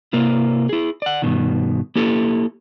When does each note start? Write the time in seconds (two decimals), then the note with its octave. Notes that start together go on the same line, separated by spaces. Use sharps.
0.13 C3 A#3 E4
0.69 E4 G#4
1.02 D5 F#5
1.22 G2 B2 D#3
1.96 A#3 E4 G4 A4